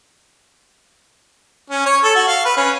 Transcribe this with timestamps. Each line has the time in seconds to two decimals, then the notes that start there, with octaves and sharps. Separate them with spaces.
1.70 C#4
1.86 C#5
2.03 A4
2.16 F#4
2.28 F5
2.45 B4
2.57 C#4